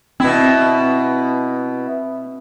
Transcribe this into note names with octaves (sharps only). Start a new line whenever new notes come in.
B2 C4 E4